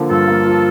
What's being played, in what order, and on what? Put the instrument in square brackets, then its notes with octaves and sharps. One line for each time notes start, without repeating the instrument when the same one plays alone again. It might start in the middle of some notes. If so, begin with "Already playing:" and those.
Already playing: [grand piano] D3 F3 A#3
[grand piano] G2 [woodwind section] F4 A4
[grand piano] A#3
F3